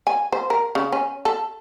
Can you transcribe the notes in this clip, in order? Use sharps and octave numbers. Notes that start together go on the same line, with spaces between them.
G#5
C5
A#4
C#3
C#4
A4